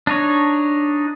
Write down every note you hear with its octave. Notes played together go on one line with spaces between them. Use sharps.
D4 D#4 C#5